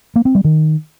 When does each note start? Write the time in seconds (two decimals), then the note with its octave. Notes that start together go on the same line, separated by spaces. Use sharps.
0.16 A#3
0.25 C4
0.35 G3
0.44 D#3